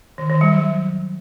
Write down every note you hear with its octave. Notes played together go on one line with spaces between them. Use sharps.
D#3
D#3
G3
F#3